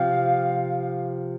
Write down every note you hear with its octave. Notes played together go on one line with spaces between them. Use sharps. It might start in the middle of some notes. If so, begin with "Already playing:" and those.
Already playing: C3 F3 F5